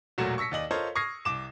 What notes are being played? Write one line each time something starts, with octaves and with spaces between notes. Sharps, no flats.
E1 A#2 F#3 A3 F#4 E7
C#6 E6 A#6 B6 C#7
D#2 D5 D#5 F#7
F4 A4 A#4 C5 C#5 D#5
C#6 D#6 F6 G#6 A#6 C7
C2 D6 E7